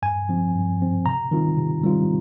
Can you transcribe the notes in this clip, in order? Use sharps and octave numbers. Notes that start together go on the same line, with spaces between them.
G2 G#5
F3 C4
G2
F3 C4
C3 A#5
D#3 G3 C4 F4
C3
D#3 G3 C4 F4